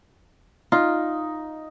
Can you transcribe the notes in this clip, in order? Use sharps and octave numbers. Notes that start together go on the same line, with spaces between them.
D#4 F4